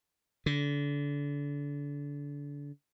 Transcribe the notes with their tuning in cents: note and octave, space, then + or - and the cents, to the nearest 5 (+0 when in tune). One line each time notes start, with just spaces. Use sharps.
D3 -30